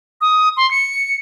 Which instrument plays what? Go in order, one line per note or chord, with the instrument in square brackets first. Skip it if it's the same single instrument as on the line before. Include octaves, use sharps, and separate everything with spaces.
[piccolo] D#6
C6
C#7